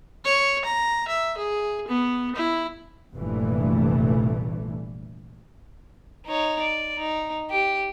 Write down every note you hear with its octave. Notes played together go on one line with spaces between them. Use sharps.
C#5
A#5
E5
G#4
B3
E4
F1 A#1 G2 E3 A3
D#4 C#5
D5
D#4
G4